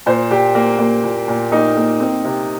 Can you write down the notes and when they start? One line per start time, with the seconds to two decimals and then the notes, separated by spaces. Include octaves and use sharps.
0.06 A#2 C5
0.31 A#2 G4
0.55 A#3
0.79 A#3
1.03 A#2
1.28 A#2
1.52 A#3 D#4
1.77 A#3
2.00 C4
2.25 C3